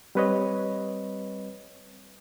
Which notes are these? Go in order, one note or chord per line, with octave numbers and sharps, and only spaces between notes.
G3 C4 B4 C#5 D#5